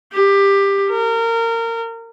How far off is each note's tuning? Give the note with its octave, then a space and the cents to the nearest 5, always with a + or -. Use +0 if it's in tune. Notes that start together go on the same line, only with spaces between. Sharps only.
G4 +15
A#4 -25